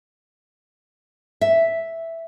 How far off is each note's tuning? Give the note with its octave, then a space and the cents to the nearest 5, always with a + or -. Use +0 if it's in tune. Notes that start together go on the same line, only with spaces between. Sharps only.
E5 +0